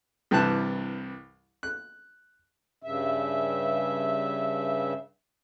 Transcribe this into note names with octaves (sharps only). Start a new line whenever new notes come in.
C2 G2 C3 E3 A5 F#6
F#6
G2 C#3 E5